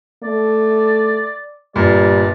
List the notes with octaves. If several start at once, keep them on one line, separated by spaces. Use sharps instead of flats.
A3 D5
G1 A#2 G3 D5